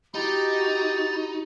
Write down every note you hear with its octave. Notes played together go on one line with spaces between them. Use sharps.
D#4 E4 F#4 G4 A6